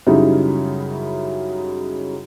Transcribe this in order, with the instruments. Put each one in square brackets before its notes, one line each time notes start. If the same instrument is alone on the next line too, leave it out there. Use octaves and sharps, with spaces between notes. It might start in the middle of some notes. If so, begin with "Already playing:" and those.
[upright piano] F#2 C#3 G3 D#4 E4